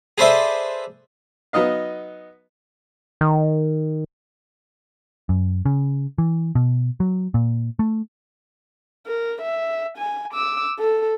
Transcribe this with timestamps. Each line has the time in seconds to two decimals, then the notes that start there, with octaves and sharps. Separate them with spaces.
0.18 G#4 A4 B4 C5 D5 E5
1.53 F#3 B3 D#4 D#5 F5
3.21 D#3
5.29 F#2
5.65 C#3
6.18 E3
6.55 B2
7.00 F#3
7.34 A#2
7.79 A3
9.07 A#4
9.42 E5
9.98 G#5
10.33 D6 E6
10.79 A4